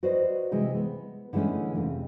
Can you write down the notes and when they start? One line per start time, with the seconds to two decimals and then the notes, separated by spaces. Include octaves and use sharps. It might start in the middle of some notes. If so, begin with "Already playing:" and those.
0.03 F#4 B4 C5 D5 D#5
0.52 C3 E3 G#3
0.75 B3
1.33 D3 E3 G#3 A3 C#4
1.75 F2 C3